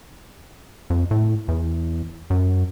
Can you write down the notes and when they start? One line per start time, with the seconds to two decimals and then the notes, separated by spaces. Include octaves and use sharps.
0.90 F2
1.11 A2
1.48 E2
2.30 F#2